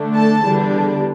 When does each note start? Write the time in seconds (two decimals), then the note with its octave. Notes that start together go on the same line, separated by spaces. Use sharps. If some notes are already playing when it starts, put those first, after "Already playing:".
Already playing: D3 A3 D4
0.15 A4 A5
0.44 E2 D3 G3 D4